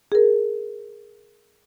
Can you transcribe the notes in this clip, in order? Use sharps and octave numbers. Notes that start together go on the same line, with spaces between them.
G#4 A#4